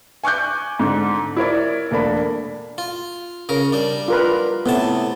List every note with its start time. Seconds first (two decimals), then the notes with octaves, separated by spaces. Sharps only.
0.24 G#5 C#6 D6 F#6 G6
0.79 G#2 D3
1.37 E4 A#4 C#5 D5
1.91 E1 A3 A#3 D4 B5
2.78 F4
3.49 C#3 A#4
3.73 G3 D4
4.08 F4 A#4 B4
4.66 A2 C3 B3 A5